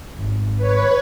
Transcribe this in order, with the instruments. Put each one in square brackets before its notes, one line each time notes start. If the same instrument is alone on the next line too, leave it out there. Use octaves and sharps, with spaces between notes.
[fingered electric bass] G#1
[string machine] B4 C#5